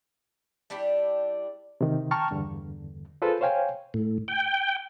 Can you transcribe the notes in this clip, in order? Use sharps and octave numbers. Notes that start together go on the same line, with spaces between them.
G3 D4 E4 G4
C3 D#3
G5 A5 A#5 C#6 F6
E2 G2 D3
F4 G#4 A4 B4 C5
C5 C#5 F5 G5 G#5
A2
G5